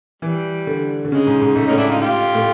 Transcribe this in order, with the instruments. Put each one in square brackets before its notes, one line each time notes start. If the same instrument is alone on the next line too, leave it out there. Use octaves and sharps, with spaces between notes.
[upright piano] E3 [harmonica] G3
[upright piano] D3
D3
[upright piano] C#3 [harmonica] G#3
[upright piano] G#2
G#2
[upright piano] G#2 [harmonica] A3
[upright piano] A2 [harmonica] C#4 D#4
[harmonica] D4 E4
D#4 F4
F4 G4
[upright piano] A2